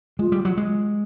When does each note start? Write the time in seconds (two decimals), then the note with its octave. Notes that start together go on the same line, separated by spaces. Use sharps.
0.19 G#3 F4
0.32 G3
0.45 F#3
0.57 G#3